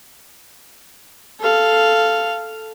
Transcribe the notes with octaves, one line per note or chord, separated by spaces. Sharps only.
A4 F5